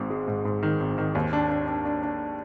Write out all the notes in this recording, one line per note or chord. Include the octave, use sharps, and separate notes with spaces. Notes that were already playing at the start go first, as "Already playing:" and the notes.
Already playing: G#1 G#2
G#3
G#2
G#2
D#3
G#1
D#3
D#2
D4
D4
D4
D4
D4